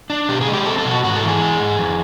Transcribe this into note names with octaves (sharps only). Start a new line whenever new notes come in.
D4
B2 G4
G#4
G#3
G4
C4 A4
A4
B2
F#4
G#2 F#4
A4
E3
G#4
G#3
G#2
F2